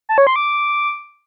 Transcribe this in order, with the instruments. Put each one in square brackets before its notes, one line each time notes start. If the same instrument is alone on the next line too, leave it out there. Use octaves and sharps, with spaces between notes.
[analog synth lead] A5
C#5
C6
D6